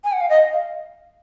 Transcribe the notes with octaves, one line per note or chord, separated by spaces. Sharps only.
G#5
F#5
F5
D#5
F5